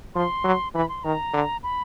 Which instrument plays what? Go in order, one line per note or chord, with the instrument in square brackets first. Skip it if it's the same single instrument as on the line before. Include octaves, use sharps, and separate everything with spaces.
[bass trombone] F3 [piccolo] C6
[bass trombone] F#3
[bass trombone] E3 [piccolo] B5
[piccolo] C6
[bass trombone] D#3 [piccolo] A#5
[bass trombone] D3
[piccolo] B5